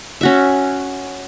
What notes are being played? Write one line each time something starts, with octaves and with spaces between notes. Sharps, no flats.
C#4 F#4 E5